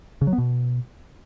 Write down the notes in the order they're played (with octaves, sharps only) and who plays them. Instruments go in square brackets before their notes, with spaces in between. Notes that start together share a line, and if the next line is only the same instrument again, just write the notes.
[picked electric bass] C#3
F#3
B3
B2